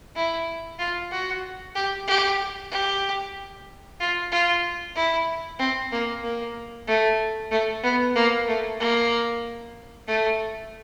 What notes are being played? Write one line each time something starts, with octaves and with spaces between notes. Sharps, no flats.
E4
F4
F#4
G4
G4
G4
F4
F4
E4
C4
A#3
A#3
A3
A3
B3
A#3
A3
A#3
A3